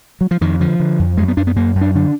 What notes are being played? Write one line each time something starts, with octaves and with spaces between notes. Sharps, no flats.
F#3
F3
F2 D#3
D3 F3
D3
F2
F#2 G#3
B3
F#2 D4
B3
F#2 A#3
F#2
D4
D3 D4